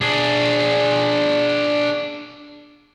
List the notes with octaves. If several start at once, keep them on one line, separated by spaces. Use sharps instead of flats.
D4 G#4